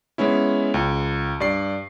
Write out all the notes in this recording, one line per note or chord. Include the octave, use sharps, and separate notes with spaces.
G#3 B3 C#4 E4
C#2
G2 D5 C7